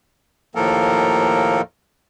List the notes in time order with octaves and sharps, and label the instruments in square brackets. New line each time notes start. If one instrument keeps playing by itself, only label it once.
[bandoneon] D#2 A2 F3 A#3 A4 A#4